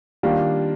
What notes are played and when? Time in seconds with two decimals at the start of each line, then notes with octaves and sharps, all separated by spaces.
0.23 D#3 G3 A#3 D4 F4